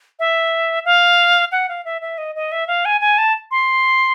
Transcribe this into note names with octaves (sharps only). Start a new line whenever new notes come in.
E5
F5
F#5
F5
E5
E5
D#5
D#5
E5
F5
G#5
G#5
A5
C6